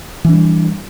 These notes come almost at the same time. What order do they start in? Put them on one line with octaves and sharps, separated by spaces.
E3 D4 G3